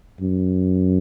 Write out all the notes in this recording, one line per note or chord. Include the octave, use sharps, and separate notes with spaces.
F#2